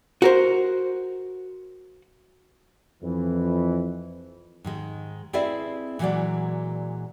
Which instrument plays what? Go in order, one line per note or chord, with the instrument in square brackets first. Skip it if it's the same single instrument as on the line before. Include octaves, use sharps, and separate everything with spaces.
[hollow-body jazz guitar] F#4 A#4 C5
[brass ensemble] F2 E3
[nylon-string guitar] G#2 D#3 G#3
C4 E4 G#4 B4 D5 E5
A#2 E3 F#3 G#3 F#4 D5